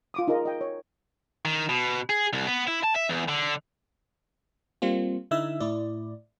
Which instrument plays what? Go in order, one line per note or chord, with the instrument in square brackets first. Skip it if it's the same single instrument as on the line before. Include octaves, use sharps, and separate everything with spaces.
[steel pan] F4 D6 D#6
D#4 F4 G#4 A#4 D#5
D#5 G5
C#5
[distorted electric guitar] D#3
B2
G#4
C2
B3
E4
A5
E5
E2
D3
[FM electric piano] G3 A#3 C4 F4
D3 D#4 E4 E5 E6
A2 E4 D5